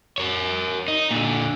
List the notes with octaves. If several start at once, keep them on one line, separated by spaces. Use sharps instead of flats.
A#4 C#5
D#4
A#2 D3